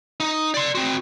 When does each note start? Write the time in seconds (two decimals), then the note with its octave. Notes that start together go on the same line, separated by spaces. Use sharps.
0.20 D#4
0.54 D5 C6
0.75 C4 F#4